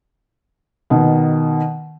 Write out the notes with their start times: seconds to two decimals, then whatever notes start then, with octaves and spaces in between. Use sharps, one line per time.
0.90 B2 D#3